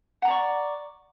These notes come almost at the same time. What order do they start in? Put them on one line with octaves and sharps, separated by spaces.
F#5 A#5 D5 C#6